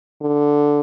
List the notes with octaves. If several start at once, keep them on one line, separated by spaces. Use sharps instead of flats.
D3